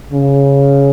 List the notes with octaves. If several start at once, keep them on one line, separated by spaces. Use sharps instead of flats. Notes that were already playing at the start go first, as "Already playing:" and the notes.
C#3